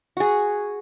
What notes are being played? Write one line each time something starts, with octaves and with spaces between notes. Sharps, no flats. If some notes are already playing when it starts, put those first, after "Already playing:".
F#4 G#4